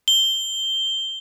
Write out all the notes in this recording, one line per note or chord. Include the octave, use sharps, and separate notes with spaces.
G7